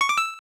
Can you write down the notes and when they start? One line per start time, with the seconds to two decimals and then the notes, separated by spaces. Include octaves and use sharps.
0.01 C#6
0.09 D6
0.18 E6